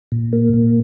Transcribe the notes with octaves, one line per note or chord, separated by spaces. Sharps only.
A#2
A#3
A#2